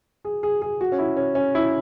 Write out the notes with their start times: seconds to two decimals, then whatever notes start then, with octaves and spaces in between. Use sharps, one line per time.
0.25 G#4
0.43 G#4
0.62 G#4
0.81 F#4
0.92 C#4
0.99 E4
1.17 C#4
1.35 C#4
1.55 E4